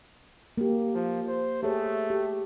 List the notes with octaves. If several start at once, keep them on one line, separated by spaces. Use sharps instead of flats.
A#3 G4
F3
C5
A3 G4 G#4 C#5
G4